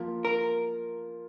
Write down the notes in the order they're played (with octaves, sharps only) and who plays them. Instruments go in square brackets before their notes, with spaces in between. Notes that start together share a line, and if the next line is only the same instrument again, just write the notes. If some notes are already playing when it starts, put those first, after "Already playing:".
Already playing: [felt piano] F3 A#3 F4
[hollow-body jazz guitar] A#4